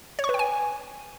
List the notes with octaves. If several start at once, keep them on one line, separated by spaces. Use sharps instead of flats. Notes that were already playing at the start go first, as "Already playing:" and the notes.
C#5
C#6
B4
G5
G#5